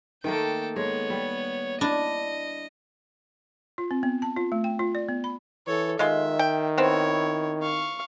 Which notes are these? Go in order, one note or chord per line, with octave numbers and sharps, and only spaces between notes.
D#3 A3 A#3 A4 G5
G#3 B3 C#5
G3
D4 E4 D#5
F4
C4
B3
A5
F4
A3
G5
F4
D5
B3
B5
E3 A4 C#5
D#3 G#3 F4 E5 C6
G5
B3 C4 E4 C#5
F5 C#6